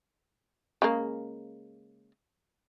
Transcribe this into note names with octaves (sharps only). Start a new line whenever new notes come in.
C#3 G#3 A#3